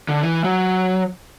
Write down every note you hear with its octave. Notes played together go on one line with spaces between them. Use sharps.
D3
E3
F#3